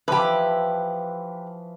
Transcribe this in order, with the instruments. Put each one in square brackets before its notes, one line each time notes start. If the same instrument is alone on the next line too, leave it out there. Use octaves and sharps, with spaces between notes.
[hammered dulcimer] E3 F3 [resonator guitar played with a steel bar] G4 B4